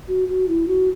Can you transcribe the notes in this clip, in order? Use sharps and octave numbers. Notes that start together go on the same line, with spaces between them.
F#4
F#4
E4
F#4